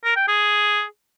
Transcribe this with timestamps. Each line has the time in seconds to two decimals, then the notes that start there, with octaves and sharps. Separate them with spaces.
0.04 A#4
0.16 G5
0.28 G#4